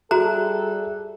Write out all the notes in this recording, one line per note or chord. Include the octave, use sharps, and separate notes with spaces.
G3 F#4 G#4 A4 E5 A#5 F#6